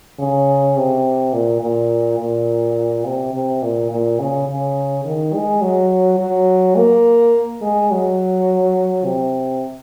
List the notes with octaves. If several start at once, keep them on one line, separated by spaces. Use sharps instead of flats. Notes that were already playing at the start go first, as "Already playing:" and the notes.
C#3
C3
A#2
A#2
A#2
C3
C3
A#2
A#2
C#3
C#3
D#3
G#3
F#3
F#3
A#3
G#3
F#3
C3